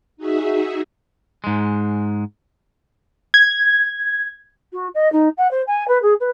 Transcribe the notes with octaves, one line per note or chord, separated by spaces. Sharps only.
D#4 F#4 G#4 E5
G#2 G#3
G#6
F#4
D#5
D#4
F#5
C5
G#5
B4
G#4
B4